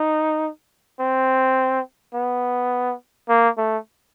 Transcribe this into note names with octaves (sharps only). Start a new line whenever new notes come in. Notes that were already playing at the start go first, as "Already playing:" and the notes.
Already playing: D#4
C4
B3
A#3
A3